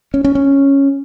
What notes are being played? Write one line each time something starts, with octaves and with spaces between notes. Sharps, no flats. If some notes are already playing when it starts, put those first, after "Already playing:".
C#4
C#4
C#4